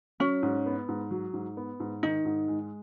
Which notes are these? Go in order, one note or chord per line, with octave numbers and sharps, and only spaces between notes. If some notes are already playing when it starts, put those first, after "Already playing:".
F#3 C#4
G#2
B3
G#2
F#3
G#2
B3
G#2
D#3 D#4
G#2
G#3